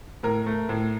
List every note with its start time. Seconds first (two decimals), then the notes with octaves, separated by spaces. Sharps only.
0.23 A2 A#4
0.46 A3
0.69 A2